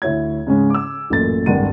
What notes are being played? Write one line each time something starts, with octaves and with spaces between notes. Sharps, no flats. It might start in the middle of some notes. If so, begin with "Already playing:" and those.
D2 E4 C#5 G#6
G#2 C#3 G#3 C#4
D6 E6
A1 F#2 A#2 A4 A6
D1 G#1 G2 F#5 D#7